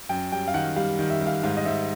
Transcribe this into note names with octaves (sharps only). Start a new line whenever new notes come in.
F#2 G5
G3 G5
F5
D#3 F#5
G3 F5
D#3
E5
G3
F5
G#2 F5
D#5
G#2 E5